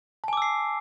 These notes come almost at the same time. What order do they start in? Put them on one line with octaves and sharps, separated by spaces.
A5 G#5 D6 E6 C7